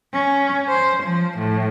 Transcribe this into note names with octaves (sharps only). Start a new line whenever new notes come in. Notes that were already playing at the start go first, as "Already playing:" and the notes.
C#4
C5
F3
A2